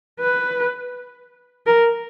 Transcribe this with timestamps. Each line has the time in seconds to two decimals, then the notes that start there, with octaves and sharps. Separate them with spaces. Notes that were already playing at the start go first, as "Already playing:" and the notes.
0.21 B4
1.66 A#4